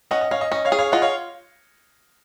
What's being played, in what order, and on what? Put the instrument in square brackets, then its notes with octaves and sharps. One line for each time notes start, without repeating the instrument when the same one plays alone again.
[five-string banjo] C#4 [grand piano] D#5 F#5
[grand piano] D#5
[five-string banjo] C#4 [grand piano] C#5 F5
[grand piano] D#5
[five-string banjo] C#4 [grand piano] D#5
[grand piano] C#5 F5
[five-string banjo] G#4
[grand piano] C#5 F5
[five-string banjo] F4 [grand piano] D#5 F#5
[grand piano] C#5 F5